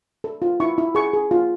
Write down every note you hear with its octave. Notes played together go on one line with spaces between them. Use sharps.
A4
F4
E4 C#6
E4
G#4 C#6
G#4
F4